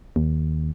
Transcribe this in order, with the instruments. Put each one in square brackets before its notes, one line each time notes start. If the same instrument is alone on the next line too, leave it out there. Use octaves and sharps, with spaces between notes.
[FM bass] D#2